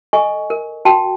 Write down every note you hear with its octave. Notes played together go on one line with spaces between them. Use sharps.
A4 D#5 G#5 C#6
A#4
F#4 G5 A5